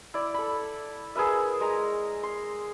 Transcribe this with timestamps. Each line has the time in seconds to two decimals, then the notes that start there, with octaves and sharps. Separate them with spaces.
0.14 E4 D5
0.34 A4 B5
1.15 G#4 A#4 B4 E5
1.60 G#3 A#5
2.23 C6